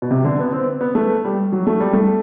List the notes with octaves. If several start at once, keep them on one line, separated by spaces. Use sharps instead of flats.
B2
C3
D3
B3
C4
B3
A3
G3
F#3
A3
G3
A3